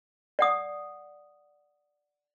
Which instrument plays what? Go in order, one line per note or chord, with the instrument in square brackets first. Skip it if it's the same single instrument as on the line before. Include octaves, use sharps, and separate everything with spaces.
[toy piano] D5 F#5 D#6